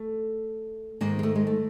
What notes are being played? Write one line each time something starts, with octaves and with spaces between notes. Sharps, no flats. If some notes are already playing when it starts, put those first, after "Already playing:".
Already playing: A3
G#2 D#3 A#3
G#3
A3
G#3
A3